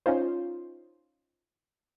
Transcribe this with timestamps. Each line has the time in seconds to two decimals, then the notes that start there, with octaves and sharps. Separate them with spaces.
0.06 C#4 D#4 F4 C5